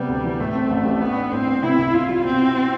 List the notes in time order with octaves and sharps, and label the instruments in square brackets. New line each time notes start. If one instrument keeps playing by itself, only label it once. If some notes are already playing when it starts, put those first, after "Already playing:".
Already playing: [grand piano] C3 B3 [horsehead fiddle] G3
[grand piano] D2
E3
[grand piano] A2 [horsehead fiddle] A3
[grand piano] C4
A1
G3
[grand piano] G3 [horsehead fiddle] B3
[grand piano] D4
[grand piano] A2 [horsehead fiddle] C4
[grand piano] B3
[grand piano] C3 [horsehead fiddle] E4
[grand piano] C2
[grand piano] C2 [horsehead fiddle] F4
[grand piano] G3
[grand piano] B2 [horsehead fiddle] C4
[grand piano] E4